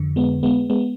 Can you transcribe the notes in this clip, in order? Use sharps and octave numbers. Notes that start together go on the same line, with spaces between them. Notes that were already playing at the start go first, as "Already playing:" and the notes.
Already playing: F2 D3
G#3 B3
G#3 B3
G#3 B3